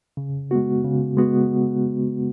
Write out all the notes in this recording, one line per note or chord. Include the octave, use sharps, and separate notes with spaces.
C#3
G#3 B3 F#4
C#3
G#3 B3 F#4